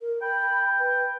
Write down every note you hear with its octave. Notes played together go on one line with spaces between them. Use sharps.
A#4
G5 B5
B4